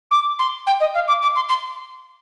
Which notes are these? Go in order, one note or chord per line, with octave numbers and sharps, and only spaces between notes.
D6
C6
G5
D#5
F5
D6
D6
C6
C6